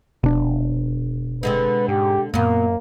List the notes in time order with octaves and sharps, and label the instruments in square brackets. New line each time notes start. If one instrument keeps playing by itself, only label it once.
[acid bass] F1 [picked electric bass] B2 D4
[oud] D3 G#3 C4 [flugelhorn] B4
[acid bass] G#2 [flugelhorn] G4
[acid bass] F#2 [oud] A#2 B3 [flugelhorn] A#3